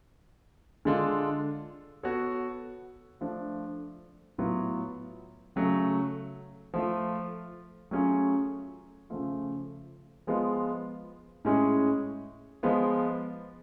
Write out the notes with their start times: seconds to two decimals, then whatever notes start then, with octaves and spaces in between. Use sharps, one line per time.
0.85 D3 G#3 D4 F4 A4
2.03 B3 F#4 A4 C#5
3.21 F3 A3 D4 F4
4.38 A2 F#3 B3 F4
5.56 C#3 F#3 A3
6.74 F3 A3 F4
7.91 F#3 A3 C#4 F4 G#4
9.10 C#3 F3 A3 F4
10.27 F3 G#3 B3 F4
11.45 A2 G#3 C#4 G#4
12.63 F3 G#3 B3 F4